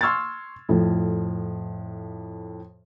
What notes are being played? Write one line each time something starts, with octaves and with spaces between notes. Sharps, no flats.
C6 C#6 E6 F6 G#6 A6
F2 A2 F3